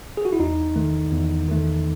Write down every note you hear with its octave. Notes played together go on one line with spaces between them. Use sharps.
G#4
F#4
E4
E2 D#4
D#3 A3
E2
D#3 A3